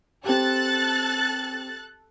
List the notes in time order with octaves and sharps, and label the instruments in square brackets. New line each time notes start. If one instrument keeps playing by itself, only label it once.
[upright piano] C4 G4 [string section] A4 F#6 A6